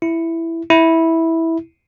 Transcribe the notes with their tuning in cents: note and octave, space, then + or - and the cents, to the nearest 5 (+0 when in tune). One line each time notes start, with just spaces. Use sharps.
E4 +5
E4 -10